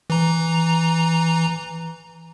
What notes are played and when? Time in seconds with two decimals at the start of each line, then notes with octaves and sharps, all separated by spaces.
0.10 E3 A#5